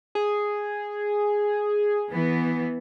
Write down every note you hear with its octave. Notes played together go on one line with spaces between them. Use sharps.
G#4
E3 B3